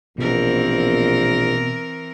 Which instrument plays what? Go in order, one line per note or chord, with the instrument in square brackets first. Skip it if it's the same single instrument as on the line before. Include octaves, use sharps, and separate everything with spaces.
[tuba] A#1 [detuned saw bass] B2 [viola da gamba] E3 C4 A#4